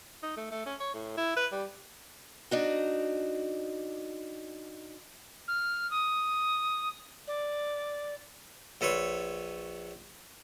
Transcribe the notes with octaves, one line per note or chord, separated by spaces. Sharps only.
D#4
A3
A3
C#4
C#5
A2
E4
B4
G3
D4 D#4 F#4
F6
D#6
D5
A#1 A4 B4 C#5 C6